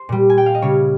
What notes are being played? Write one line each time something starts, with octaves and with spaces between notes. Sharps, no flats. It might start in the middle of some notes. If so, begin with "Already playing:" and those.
Already playing: C5
A#2 G3
G#5
G5
F5
D#5
C#3 G3 C#5